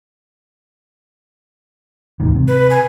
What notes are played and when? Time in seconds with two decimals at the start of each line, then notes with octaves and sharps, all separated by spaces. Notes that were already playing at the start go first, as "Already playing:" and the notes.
2.20 D#2 G#2 D#3
2.34 C3
2.48 B4
2.70 G#5